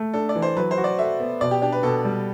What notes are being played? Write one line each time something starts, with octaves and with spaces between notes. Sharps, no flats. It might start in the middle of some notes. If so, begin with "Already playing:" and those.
Already playing: A3
D4 A4
D5
E3
C5
F#3 B4
C5
F#4
D5
A4 E5
B3
B2 D5
G4
D4 G4
B4
B2 A4
G3